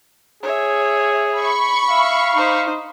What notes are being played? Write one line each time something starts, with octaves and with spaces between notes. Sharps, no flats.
G#4 C#5 E5
B5 C#6
E5 F5
D#4 C5